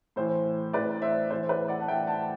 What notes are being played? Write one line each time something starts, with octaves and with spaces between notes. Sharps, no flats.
A2 E3 C5
A2 E3 B4 D5
C5 E5
A2 E3 C5 E5
B4 D5
D5 F#5
A5
A2 E3 E5 G5
F#5 A5